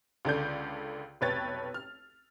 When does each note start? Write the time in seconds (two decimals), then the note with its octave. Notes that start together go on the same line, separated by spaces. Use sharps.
0.25 C#2 D3 D5 G6
1.21 F1 B1 B4 C#5 G5 A6
1.74 F6